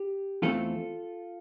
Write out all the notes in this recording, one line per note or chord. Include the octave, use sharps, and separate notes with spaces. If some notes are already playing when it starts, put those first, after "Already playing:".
Already playing: G4
E2 E3 A3 C4 F4 A4